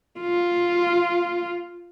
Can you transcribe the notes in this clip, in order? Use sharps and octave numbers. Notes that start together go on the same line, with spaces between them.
F4